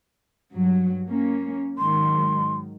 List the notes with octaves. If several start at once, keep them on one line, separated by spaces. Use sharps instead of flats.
G2 F#3
A#3 C#4
G#2 D#3 F#3 C6